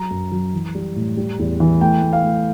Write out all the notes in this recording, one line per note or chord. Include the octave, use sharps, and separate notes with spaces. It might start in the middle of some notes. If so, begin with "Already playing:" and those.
Already playing: F#3 A#5
F#2
F#3
E3
G3
A2
G3
E2
E3
A3 G5
A3
F5
A3